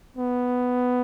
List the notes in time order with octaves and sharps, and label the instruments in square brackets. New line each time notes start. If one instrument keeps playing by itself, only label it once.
[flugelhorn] B3